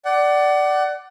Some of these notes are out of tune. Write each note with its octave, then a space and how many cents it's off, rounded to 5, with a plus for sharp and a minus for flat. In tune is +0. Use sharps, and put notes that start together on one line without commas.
D5 +0 F#5 +30